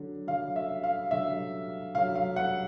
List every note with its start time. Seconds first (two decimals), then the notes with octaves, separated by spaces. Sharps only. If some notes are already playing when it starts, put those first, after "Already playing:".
Already playing: D3 F#3
0.27 D3 F#3 F5
0.56 E5
0.83 F5
1.11 D3 F#3 E5
1.95 D3 F#3 F5
2.15 F5
2.36 F#5